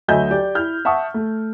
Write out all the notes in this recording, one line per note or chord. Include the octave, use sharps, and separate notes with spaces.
D2 F#3 D#5 E5 G#5 G6
G4 D5
E4 F6 G6
E5 F#5 A5 C#6 D#6
A3